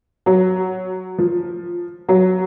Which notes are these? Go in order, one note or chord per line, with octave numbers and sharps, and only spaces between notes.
F#3
F3
F#3